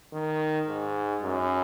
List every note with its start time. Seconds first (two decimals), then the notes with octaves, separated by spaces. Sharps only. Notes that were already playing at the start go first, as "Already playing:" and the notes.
0.13 D#3
0.68 G#2
1.22 F#2